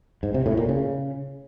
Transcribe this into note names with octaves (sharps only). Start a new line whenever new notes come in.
G#2
C3
A2
A#2
C#3